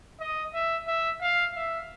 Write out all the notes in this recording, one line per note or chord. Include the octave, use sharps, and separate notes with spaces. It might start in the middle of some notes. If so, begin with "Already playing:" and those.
D#5
E5
E5
F5
E5